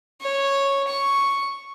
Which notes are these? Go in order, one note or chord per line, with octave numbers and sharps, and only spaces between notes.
C#5
C#6